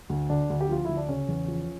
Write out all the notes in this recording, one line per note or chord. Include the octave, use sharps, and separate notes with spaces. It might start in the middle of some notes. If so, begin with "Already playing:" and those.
D2
D3 D4
D2
G4
F3 F4
D2 E4
D4
C#3 C#4
E2
F3